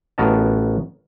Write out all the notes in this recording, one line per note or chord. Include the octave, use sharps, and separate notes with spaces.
A1 B3 F#4 A#4 D#5 A5